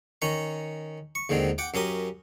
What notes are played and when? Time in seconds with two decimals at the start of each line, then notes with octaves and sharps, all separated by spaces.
0.22 D#3 C#4 A#5 C#6
1.15 C#6
1.29 D#2 G#2 D3 D#3 C4
1.58 F#5 G5 D6
1.74 F#2 C#4 G4 A#4 D#6